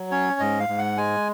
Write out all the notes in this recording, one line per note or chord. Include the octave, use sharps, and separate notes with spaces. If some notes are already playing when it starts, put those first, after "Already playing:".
Already playing: F#3
C#4 C#5
G#2 D#5
F5
G#2
F#5
G#3 G#5